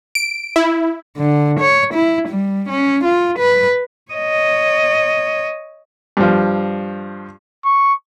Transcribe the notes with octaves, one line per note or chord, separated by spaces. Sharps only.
D7
E4
D3
C#5
E4
G3
C#4
F4
B4
C#5 D#5
G2 F3
C#6